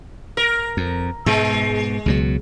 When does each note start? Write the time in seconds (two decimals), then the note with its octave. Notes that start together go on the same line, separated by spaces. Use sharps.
0.37 A#4
0.77 F2
1.26 G#2 B2 G#3
2.06 C#2 B2 F#3